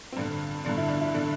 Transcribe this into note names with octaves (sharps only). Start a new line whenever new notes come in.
C4
G2 D3 D4
G2 D3 D4
E4
D4
E4
D3 D4